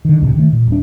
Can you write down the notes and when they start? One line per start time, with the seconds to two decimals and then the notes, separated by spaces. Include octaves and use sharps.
0.05 D3 D#3
0.22 C#2 A2 C3
0.36 D#3 A3
0.53 A#2
0.68 D#1 D4